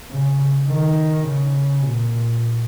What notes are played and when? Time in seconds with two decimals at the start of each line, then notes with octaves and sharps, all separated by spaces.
0.10 C#3
0.69 D#3
1.27 C#3
1.84 A#2